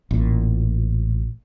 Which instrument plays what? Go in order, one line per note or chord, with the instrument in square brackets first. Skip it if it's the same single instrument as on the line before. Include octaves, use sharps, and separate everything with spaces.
[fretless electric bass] A1 A#2